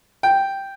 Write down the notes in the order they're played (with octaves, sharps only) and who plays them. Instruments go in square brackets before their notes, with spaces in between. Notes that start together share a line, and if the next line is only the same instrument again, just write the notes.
[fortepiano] G5